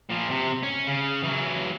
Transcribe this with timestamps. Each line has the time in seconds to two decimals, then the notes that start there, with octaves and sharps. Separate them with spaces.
0.10 A#2 F3
0.30 C3
0.63 C#4
0.87 C#3
1.23 E3 F#3